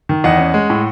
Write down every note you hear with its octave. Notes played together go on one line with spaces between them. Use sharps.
D#3
E2 D#5 F#5
C#4
G#3
A2